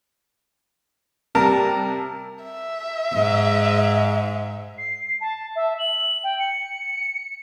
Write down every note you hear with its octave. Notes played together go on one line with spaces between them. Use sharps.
C3 G3 A#4 A5 A#5
E5
G#2
C7
A5
E5
F#7
G5
C#7